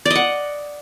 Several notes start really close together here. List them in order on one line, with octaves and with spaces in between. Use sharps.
D5 D#5 F#5